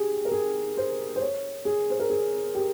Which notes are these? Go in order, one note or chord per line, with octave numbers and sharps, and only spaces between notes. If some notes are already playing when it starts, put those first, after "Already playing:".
Already playing: G4 G#4
A#4
G#4
C5
C5
C#5
G#4
C5
A#4
G#4
G4